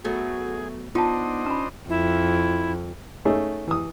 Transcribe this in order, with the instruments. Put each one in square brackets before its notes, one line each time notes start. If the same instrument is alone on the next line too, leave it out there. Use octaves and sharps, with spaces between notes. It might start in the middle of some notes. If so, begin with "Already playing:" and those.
[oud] F#3 A3 B3 [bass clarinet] F#4 [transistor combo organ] G#4
[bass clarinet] B3 [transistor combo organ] D4 C5 D#5 [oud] D#4 [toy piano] F4 A5
[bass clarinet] C#4 [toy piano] A#5 B5
[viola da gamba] F2 [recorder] E4
[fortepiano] A3 C#4 D#4 G#4
E3 D#6